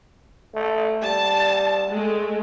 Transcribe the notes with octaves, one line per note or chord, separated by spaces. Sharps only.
A3
G3 A5
G#3 A3